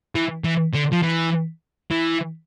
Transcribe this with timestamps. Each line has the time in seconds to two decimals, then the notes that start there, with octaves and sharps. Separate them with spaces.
0.16 E3
0.44 E3
0.74 D3
0.92 F3
1.02 E3
1.91 E3